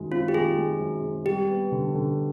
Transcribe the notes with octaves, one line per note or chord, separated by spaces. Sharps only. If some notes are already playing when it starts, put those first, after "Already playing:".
Already playing: F#2 D#3 G#3
C4 F4
G4
D#3 G#4
G#3
F#2
C4
G3 G4
B3
D3
D3